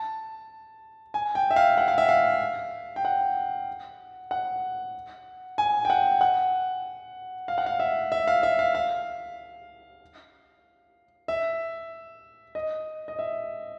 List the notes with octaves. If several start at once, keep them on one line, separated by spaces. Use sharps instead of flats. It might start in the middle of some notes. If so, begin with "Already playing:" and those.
Already playing: A5
G#5
G5
E5
F5
F#5
F5
E5
F5
G5
F#5
F#5
G#5
G5
F#5
F#5
F5
F#5
F5
E5
E5
F5
E5
F5
F5
E5
D#5
D#5
E5